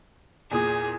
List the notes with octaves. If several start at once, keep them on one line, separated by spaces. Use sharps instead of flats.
E2 A#2 G#4 D#6